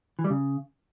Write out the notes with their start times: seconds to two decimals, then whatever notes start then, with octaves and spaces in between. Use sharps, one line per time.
0.19 E3
0.24 G3
0.30 C#3